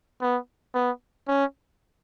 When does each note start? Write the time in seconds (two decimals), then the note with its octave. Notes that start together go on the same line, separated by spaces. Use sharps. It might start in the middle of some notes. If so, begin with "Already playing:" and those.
0.21 B3
0.75 B3
1.28 C#4